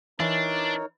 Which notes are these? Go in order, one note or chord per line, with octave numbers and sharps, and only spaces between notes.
E3 D4 D#4 A#4 C#5